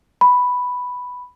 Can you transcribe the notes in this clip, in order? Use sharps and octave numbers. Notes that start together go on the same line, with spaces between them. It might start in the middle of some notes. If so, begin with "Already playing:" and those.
B5